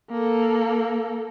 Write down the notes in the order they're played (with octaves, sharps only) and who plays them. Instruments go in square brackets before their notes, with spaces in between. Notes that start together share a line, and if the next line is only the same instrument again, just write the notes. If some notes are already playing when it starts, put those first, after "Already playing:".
[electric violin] A#3 A4